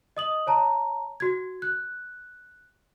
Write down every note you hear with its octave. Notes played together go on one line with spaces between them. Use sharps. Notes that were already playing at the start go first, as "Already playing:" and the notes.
D#5 D#6 F#7
C#5 A5 A#5
F#4 G#6
F#6